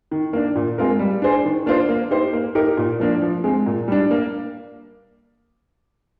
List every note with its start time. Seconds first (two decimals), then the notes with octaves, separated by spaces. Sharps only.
0.11 D#3
0.33 A#3 D4
0.55 A#2
0.78 G#3 C4 F4 A#4
0.99 G3
1.22 D4 G#4 C5
1.45 D#3
1.66 A#3 D4 F4 C5
1.88 A#3
2.11 D#4 G4 C5
2.33 A#3
2.55 D#4 G4 A#4
2.77 A#2
2.99 F3 A#3 D4
3.22 F3
3.44 G#3 C4
3.66 A#2
3.88 G3 D4
4.11 A#3